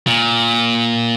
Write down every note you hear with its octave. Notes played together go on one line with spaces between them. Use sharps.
A#2